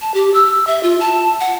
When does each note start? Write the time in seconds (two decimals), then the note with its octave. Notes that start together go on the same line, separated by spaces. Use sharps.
0.01 A5
0.14 G4
0.34 E6
0.67 E5
0.83 F4
1.00 A5
1.40 F#5